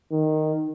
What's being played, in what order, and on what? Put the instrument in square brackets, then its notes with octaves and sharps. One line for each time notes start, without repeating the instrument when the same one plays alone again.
[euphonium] D#3